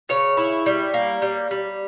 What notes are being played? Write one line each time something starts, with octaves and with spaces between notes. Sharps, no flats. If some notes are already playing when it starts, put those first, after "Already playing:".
C#3 C#5
E4
G3
A#3
G3
G3